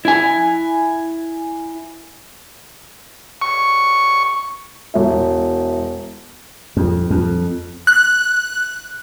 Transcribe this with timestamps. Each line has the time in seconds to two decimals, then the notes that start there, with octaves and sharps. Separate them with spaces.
0.05 E4 G#5
3.42 C#6
4.94 E1 E5
6.77 F2
7.10 F2
7.87 F#6